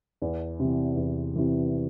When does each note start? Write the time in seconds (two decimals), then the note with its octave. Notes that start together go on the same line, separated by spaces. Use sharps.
0.22 E2
0.60 C3 E3
0.97 E2
1.36 C3 E3